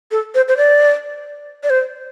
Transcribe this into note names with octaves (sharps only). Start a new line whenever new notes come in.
A4
C5
C5
D5
D5
C5